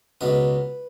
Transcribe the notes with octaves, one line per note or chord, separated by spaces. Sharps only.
C#2 B2 F#3 B4